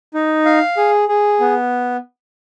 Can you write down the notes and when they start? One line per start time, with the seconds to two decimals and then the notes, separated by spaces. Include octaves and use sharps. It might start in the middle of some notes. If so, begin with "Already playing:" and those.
0.14 D#4
0.45 F5
0.77 G#4
1.09 G#4
1.40 B3